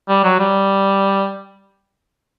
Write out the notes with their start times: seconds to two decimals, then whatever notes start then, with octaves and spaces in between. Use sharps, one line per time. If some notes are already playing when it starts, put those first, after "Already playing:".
0.09 G3
0.23 F#3
0.39 G3